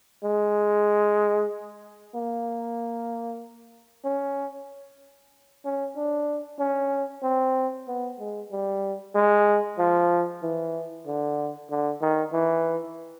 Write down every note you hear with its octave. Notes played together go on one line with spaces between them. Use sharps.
G#3
A#3
C#4
C#4
D4
C#4
C4
B3
G#3
G3
G#3
F3
E3
D3
D3
D#3
E3